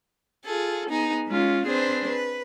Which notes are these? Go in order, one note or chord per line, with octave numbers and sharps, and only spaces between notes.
F4 G#4 A4
B3 D#4 G#4
G#3 C#4 F4
C4 D4 G#4 B4 C5
B4